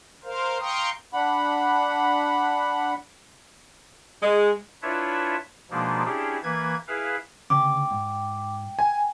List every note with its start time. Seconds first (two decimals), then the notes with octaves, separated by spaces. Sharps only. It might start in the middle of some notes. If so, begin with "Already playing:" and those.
0.24 A#4 C5 F5
0.60 F5 G5 A#5 C6 C#6 D#6
1.13 D4 F#5 B5
4.22 G#3
4.82 D4 E4 F4 B4 C#5 E5
5.71 B2 F3 G#3 A#3 D4 D#4
6.05 C#4 D4 E4 G4 G#4
6.43 E3 A#3 B4 G#6
6.87 E4 G#4 B4 F5
7.50 D2 C#3 C#4 G5 D6
7.91 G#2
8.79 G#5